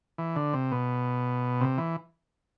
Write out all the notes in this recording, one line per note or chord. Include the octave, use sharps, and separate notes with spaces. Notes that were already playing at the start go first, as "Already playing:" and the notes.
E3
D3
C3
B2
C3
E3